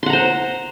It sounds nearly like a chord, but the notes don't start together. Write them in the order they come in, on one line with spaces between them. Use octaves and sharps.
C6 F#5 A#5 C5